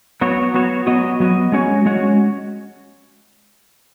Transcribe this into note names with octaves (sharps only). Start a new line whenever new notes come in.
F#3 B3 F#4 C#5
F#3 B3 F#4 C#5
F#3 B3 F#4 D#5
F#3 B3 F#4 D#5
G#3 C#4 F#4 C#5
G#3 C#4 F#4 C#5